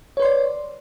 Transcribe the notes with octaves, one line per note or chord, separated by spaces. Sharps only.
B4 C#5 D5 C6